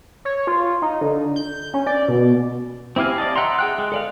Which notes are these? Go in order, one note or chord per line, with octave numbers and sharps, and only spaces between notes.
C#5
F4
D#4
D3
G6
C#4
D5
B2
C4 E4 G4 F5 G#5
D5 D#5 A5
E5 F#5 G5 A#5 C6
G#4 G5 F#6
G#3
A4 D5 F5